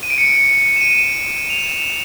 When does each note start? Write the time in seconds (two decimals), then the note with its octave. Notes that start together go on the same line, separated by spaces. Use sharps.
0.03 D#7
0.10 D7
0.18 C#7
0.25 D7
0.76 E7
0.81 D#7
1.50 F7
1.59 E7